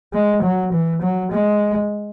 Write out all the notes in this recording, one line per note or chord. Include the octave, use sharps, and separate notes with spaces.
G#3
F#3
E3
F#3
G#3